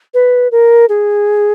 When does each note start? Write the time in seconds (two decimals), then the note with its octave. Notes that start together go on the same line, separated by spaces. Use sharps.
0.14 B4
0.52 A#4
0.89 G#4